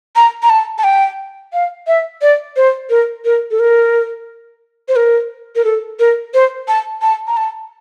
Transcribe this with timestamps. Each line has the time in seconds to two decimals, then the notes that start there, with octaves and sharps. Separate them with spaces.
0.16 A#5
0.43 A#5
0.50 A5
0.78 A5
0.84 G5
1.53 F5
1.87 E5
2.22 D5
2.57 C5
2.90 A#4
3.25 A#4
3.51 A4
3.59 A#4
4.88 C5
4.96 A#4
5.56 A#4
5.64 A4
5.99 A#4
6.34 C5
6.68 A5
7.02 A5
7.28 A#5
7.37 A5